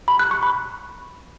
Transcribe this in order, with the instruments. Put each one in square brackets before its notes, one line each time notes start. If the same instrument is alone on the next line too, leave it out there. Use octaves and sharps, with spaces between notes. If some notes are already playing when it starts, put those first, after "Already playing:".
[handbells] B5
F#6
C#6
B5